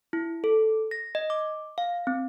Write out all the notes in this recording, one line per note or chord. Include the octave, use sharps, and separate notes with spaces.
E4
A4
A#6
D#5
D6
F5
C4